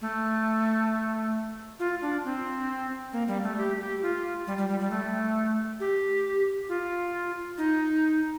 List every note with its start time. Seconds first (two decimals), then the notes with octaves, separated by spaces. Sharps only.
0.01 A3
1.80 F4
2.02 D4
2.25 C4
3.13 A#3
3.28 G3
3.43 A3
3.58 G4
3.80 G4
4.02 F4
4.47 G3
4.58 G3
4.69 G3
4.80 G3
4.91 A3
5.80 G4
6.69 F4
7.58 D#4